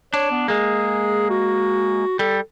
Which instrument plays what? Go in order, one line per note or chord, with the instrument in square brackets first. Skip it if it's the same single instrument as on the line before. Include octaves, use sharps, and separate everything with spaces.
[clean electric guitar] D4 [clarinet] C#5
[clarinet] B3
[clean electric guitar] G#3 A#3 [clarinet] G#4
[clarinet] F#4
[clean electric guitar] G3 [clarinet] A4